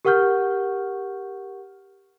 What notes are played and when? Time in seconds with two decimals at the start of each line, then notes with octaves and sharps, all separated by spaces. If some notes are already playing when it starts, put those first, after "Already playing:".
0.05 G4 A#4 F#5 C#6 F6 G6